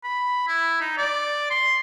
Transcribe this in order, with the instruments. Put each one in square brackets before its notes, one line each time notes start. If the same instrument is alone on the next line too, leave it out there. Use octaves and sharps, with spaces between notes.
[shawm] B5
E4
D#4
D5
C6